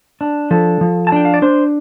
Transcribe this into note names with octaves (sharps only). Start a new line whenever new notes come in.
D4
F3 A4
F3
A5
D4 G5
F5
D5
D4 C5